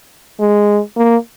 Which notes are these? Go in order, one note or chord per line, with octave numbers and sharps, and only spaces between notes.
G#3
A#3